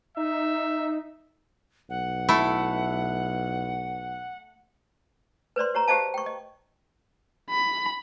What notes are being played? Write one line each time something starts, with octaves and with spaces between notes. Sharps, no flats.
D#4 E5
B1 F#5
A3 E4
B4 C5 D5 C6
G4 C#5 A#5
G4 G#4 C5 D#5 F5 A5
G5 C#6
D#5
B5